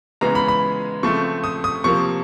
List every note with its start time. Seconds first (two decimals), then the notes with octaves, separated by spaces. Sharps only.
0.21 C#3 E3 G#3 B3 A#5
0.35 B5
0.48 B5
1.03 C#3 F3 A3 C4 C#6
1.44 D#6
1.64 D#6
1.84 C3 F3 A#3 C#6